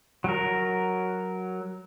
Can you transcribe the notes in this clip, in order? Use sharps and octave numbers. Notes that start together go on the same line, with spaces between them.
F#3 A#4